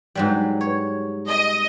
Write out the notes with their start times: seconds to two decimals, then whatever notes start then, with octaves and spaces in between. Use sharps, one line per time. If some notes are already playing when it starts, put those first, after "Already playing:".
0.15 G#2 F#3 G3
0.61 C#5
1.29 D#5